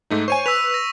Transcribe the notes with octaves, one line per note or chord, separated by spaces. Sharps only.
G#2 A3 D#4
C5 C#5 G#5 C#6 D#7
B4 E6 B6 F7
A#6